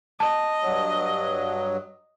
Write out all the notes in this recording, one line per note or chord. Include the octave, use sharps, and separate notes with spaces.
D#5 A5
G2 F#3